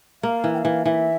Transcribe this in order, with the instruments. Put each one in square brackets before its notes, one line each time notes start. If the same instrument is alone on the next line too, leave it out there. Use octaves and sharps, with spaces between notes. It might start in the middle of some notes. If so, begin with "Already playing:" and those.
[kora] A#3 [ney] F5
[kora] E3
[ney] G5
F5
[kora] E3
[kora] E3 [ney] E5 F5